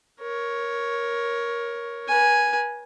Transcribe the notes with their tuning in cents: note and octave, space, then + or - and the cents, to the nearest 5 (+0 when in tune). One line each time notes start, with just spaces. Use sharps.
A#4 +15 C#5 +0
B4 -40 G#5 +0